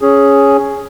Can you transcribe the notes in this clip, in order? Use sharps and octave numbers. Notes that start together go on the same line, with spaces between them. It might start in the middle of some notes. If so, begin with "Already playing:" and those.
C#4 G#4